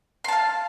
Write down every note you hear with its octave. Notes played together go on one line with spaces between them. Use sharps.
F5 A5 C6